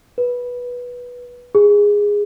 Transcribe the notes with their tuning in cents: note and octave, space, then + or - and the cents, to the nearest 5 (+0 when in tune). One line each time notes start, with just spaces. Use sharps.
B4 -10
G#4 -10